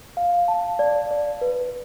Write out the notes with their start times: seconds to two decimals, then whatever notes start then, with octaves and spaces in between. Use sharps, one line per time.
0.17 F5
0.48 A5
0.79 D5
1.11 D5
1.41 B4